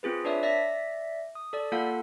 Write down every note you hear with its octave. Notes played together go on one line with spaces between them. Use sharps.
C4 F4 G#4 B4
D4 B4 C#5 D5 E5
D5 E5 A#6 B6
D#6
A4 D5
A#3 F4 A4 F5 F#5